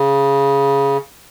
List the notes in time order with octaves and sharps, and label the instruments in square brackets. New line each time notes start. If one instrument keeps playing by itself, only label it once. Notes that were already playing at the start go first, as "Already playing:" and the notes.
Already playing: [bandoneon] C#3